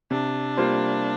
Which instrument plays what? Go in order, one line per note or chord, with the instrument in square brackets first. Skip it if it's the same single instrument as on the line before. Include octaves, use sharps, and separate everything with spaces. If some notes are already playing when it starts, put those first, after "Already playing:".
[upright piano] C3 [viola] D4
[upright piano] G3 A#3 F4 C5